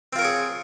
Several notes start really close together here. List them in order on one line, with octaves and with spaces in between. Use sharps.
C4 F4 A#4 C#5 G#4